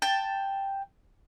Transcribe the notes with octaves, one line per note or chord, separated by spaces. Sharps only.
G5 A5